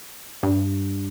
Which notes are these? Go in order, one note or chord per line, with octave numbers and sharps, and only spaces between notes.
G2